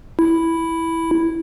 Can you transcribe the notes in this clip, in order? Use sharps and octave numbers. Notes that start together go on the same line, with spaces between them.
E4